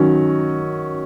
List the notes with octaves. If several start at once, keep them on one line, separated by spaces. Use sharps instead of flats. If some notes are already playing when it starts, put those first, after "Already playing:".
Already playing: D#3 F#3 C#4